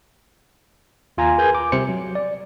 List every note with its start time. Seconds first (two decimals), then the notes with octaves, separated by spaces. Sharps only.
1.18 D#2 F4 G#5 A#5
1.38 G#4 A#4 B4 G#5 G6
1.55 D6
1.72 C3 G3 C5 C#7
1.89 F#3
2.15 D5